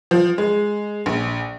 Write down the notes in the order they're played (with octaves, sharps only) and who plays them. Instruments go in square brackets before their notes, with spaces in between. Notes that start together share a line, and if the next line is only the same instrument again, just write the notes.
[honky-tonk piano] F3
G#3
A#1